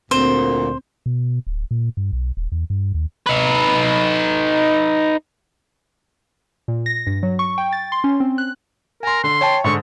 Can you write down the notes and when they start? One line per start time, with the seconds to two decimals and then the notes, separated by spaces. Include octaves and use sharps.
0.11 D2 A#2 C4 C5
1.06 B2
1.47 D1
1.71 A#2
1.97 G2
2.13 B1
2.37 D#1
2.52 E2
2.70 G2
2.94 D#2
3.26 D#4 B4
6.68 A#2
6.86 A#6
7.07 G2
7.23 F#3
7.39 C#6
7.58 G5
7.73 A6
7.92 C6
8.04 C#4
8.20 C4
8.38 F#6
9.03 A#4 G#5 C6
9.24 D3 C6
9.41 C#5 G5 A5
9.64 G#2 D3 C#6